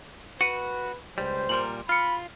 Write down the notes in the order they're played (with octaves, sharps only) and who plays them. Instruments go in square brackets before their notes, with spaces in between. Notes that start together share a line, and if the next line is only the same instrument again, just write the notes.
[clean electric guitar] F#4 [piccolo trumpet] B4 [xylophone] C#7 D#7
[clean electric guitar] C#2 G3 [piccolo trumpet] C5
[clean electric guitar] A#2 G3 A#4 [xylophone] C6 F#7
[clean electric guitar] F4 [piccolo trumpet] B5 [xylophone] F6 C#7